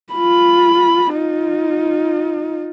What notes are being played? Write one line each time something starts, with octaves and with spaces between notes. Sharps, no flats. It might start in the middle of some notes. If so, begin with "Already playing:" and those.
F4 B5
D#4 F4